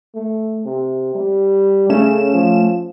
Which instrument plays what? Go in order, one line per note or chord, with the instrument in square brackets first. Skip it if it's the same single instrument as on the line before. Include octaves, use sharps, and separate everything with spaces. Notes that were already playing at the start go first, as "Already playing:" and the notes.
[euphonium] A3
C3
G3
[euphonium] C#3 [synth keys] A3 C#4 E7
[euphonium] F3